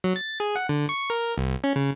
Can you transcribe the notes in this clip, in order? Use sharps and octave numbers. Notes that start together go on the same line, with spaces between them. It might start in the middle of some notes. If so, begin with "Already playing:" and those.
F#3
A6
G#4
F#5
D3
C#6
A#4
C2
C#4
C#3